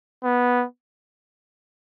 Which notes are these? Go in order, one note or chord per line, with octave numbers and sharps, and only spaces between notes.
B3